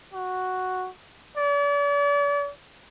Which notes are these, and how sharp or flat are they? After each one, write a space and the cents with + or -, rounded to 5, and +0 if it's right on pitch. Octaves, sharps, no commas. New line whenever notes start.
F#4 +0
D5 -40